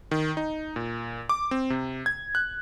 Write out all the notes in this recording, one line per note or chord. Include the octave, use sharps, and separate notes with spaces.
D#3
D#4
A#2
D6
C4
C3
G#6
F#6